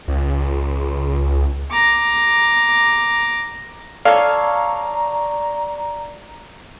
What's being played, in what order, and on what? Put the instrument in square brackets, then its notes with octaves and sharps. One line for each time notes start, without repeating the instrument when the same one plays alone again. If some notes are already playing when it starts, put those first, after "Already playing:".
[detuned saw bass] C#2
[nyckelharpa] A#5 D6
[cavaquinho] A4 C#5 [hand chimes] D5 [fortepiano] F5 [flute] A#5